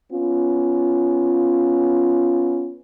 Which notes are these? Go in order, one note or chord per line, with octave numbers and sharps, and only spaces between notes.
B3 C#4 F4